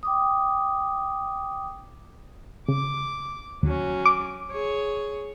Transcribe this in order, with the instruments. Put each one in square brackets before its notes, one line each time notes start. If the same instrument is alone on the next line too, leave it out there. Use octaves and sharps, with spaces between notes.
[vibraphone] G5 D6 D#6
[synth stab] C#3 [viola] D6
[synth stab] D#2 [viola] F#3 C#4
[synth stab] D6
[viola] G#4 C#5